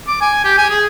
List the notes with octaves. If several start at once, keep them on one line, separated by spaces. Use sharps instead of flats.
D6
G#5
G4
G#5
G#4